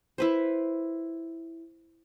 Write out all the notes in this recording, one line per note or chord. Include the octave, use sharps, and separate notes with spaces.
E4 B4 C5